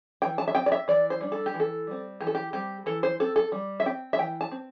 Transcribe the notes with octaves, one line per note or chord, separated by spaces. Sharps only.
E3 G5
A5
E5
C4 G5
D5
E5
E3 D5
C5
G3 D4
A4
G4
E3
A4
G3 C4
E3 G4
A4
G4
G3 C4 G4
E3 A4
C5
C4 A4
A4
G3
E5
C4 G5
E5
E3 G5
A5
C4